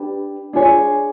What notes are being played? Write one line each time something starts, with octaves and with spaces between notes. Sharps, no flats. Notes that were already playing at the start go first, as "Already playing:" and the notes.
Already playing: D4 G4 B4
D4 F4 G#4 C#5